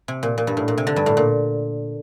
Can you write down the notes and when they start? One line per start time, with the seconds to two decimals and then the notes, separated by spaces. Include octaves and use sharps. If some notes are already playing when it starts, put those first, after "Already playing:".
0.08 C3
0.23 A#2
0.38 A#2
0.47 G2
0.57 A2
0.68 A#2
0.78 C3
0.87 D3
0.96 G2
1.06 A2
1.17 A#2